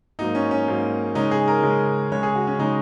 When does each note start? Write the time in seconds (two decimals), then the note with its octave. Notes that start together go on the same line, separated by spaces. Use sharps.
0.19 G#2 F#3 A#3 D#4
0.35 C#4
0.51 C#4
0.67 G#2 F#3 A#3
1.15 C#3 G#3 C#4 D#4
1.31 G#4
1.48 A#4
1.63 C#3 G#3 C#4
2.12 C#3 G#3 C#4 C#5
2.23 G#4
2.35 F#4
2.47 C#4
2.59 C#3 G#3 C#4 D#4